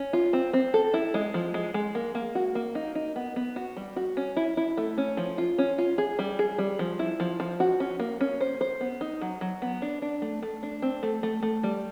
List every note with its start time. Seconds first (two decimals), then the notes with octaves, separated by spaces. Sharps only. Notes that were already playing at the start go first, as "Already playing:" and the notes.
Already playing: C#4
0.13 F4
0.33 C4
0.53 C4
0.74 A4
0.94 E4
1.14 G#3
1.34 F3
1.54 G#3
1.74 G#3
1.95 A#3
2.15 A#3
2.35 F#4
2.55 A#3
2.75 D#4
2.95 D#4
3.16 B3
3.36 B3
3.56 F#4
3.77 G3
3.96 F#4
4.17 C#4
4.37 E4
4.57 E4
4.77 A3
4.98 C#4
5.17 F3
5.38 F4
5.58 C#4
5.78 F4
5.98 G#4
6.19 G3
6.39 G#4
6.58 G3
6.79 F3
6.99 E4
7.20 F3
7.40 F3
7.60 F#4
7.80 C#4
8.00 A#3
8.21 C#4
8.40 C5
8.61 C5
8.81 B3
9.01 D#4
9.21 F#3
9.41 F#3
9.62 B3
9.82 D4
10.02 D4
10.22 A3
10.43 A3
10.63 D4
10.82 C4
11.03 A3
11.23 A3
11.43 A3
11.63 G3